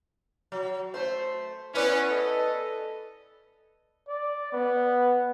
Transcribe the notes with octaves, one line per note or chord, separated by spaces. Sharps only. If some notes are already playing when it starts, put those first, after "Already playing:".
F#3
A3 C5
B3 C#4 E4 B4 D5
A4 D#5
D5
B3